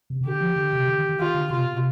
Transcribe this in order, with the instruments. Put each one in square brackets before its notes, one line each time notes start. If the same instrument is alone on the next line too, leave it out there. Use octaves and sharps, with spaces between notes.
[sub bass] C3
C3
[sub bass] D3 [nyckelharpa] G4
[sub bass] F3
D3
C3
D3
D#3
D#3
[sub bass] D#3 [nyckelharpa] F4
[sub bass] D3
[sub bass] C3 [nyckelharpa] F4
[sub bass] B2
C3